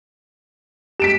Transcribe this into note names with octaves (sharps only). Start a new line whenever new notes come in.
G4 B6 D7 E7